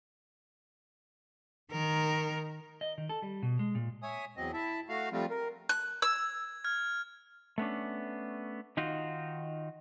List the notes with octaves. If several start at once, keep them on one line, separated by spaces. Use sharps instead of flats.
D#3 A#4
D#5
D#3
A4
G3
B2
G#3
A#2
C#5 E5 G#5 D#6
E2 F#3 C4 D#5
E4 E5 A5
A3 F#4 F5
F3 G3 A3 C4 F4
A#4
F#6
E6 G#6
F6 G#6
A3 B3 C#4 D4
D#3 D#4 F4 F#4